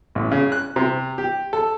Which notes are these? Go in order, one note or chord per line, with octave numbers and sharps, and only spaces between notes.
A1
C#3
F#6
C3
G4
A4